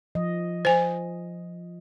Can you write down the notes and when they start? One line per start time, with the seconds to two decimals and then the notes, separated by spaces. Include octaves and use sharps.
0.15 F3 D#5
0.65 C5 G#5